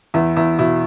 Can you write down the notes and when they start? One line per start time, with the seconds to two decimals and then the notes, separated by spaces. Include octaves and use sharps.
0.14 E2 E4
0.36 E2 E4
0.59 B2 E4